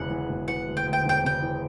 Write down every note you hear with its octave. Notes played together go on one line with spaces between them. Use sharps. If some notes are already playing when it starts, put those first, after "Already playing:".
Already playing: E1 D2 C#3 E3 F#5
E3
E1
E3 F#5
D2
G5
D2
G5
E1 G5
C#3 G5
E3